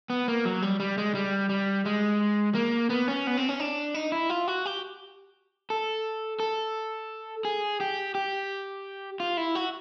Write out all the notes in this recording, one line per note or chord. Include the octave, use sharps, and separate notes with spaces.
B3
A#3
F#3
G3
G3
G#3
G3
G3
G#3
A#3
B3
C#4
B3
C4
C#4
D4
D#4
E4
F4
F#4
G4
A4
A4
G#4
G4
G4
F4
E4
F#4